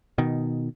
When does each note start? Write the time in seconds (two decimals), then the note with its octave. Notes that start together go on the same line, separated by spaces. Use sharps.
0.18 B2 D#3